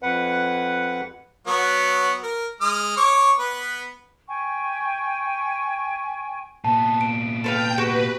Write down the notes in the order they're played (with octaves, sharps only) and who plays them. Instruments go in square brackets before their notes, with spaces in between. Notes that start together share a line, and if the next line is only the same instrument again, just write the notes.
[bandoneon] F2 B4 F#5
[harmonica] F#3 B3 C#5
A#4
G#3 D#6 F6
C#5 C#6 D6
B3 B4
[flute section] G5 G#5 C#6
[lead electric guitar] A#2 B3 [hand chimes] A5
[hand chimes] D7
[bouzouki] A4 B4 F5 [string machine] G5 G6
[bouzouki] F#4 G4 [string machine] B4